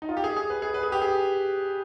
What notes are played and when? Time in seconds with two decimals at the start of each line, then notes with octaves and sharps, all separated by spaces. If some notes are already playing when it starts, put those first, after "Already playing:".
0.02 D#4
0.09 F4
0.17 G4
0.24 G#4
0.36 G#4
0.50 B4
0.62 G#4
0.74 B4
0.83 G#4
0.92 G4
1.02 G#4